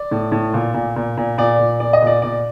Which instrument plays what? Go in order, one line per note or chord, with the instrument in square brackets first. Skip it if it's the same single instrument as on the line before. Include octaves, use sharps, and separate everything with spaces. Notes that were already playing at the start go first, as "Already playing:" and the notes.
Already playing: [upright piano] D5
A2
A2
A#2
A#2
A#2
A#2
A#2 D5
A#2
A#2 D5
D#5
A#2 D5
A#2 D5